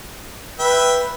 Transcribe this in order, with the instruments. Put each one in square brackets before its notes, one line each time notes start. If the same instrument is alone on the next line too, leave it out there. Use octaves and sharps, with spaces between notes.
[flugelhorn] B4 [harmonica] E5 G5